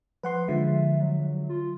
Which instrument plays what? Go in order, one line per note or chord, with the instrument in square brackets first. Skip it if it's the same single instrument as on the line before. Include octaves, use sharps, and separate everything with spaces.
[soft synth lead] F3 [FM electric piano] B4 F#5 C6
[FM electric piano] D3 F3 G#3 [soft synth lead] E5
[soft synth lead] F#3
F4